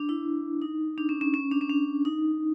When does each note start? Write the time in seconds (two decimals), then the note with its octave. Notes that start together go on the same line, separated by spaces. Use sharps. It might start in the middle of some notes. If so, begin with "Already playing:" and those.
Already playing: D4
0.09 E4
0.62 D#4
0.98 D4
1.09 C#4
1.21 C#4
1.34 C#4
1.51 D4
1.61 C#4
1.70 D4
2.05 D#4